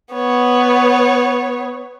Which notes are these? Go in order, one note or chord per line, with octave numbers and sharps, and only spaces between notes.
B3 C#5